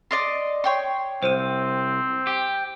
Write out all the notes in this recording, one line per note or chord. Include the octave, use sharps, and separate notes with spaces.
D5 D#5 C6
C#5 G5 C6
C2 C4 C5 D#7
G4